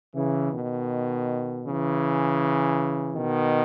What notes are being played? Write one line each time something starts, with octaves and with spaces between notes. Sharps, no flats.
C#3 E3
B2 D#3
C#3 E3
B2 D#3